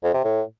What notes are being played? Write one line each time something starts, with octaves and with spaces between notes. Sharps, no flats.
F2
C3
A2